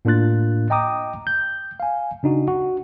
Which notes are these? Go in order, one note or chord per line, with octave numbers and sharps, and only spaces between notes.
A2 A#3 D4 F4 F#6 A6
D#5 G5 A#5 D6 D#6
G6
F5 G#5
C#3 D4 D#4 F#4
F#4